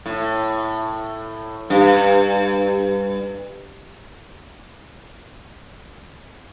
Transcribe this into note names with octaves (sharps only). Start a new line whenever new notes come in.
A2
G2